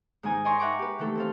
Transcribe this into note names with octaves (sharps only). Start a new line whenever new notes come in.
G#2 D#3 D#4 G#5 D#6
D5 D#5 G#5 A#5 C6 C#6
E5 F#5 G5 A#5 C#6 D6
G4 B4
D#3 E3 A3 A4
C4 A4 F5